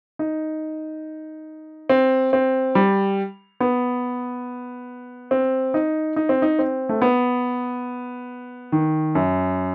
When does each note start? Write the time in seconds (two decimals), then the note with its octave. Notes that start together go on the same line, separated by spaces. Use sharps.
0.19 D#4
1.90 C4
2.33 C4
2.75 G3
3.60 B3
5.31 C4
5.74 D#4
6.16 D#4
6.29 C4
6.42 D#4
6.59 C4
6.89 A3
7.02 B3
8.72 D#3
9.15 F#2